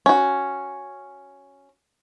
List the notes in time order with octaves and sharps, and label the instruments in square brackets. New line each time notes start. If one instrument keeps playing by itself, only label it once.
[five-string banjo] C#4 F#4